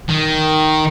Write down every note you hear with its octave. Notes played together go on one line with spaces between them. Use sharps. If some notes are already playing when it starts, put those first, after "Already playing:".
D#3